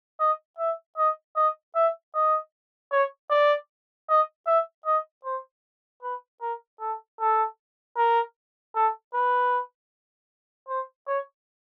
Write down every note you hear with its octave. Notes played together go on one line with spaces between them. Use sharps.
D#5
E5
D#5
D#5
E5
D#5
C#5
D5
D#5
E5
D#5
C5
B4
A#4
A4
A4
A#4
A4
B4
C5
C#5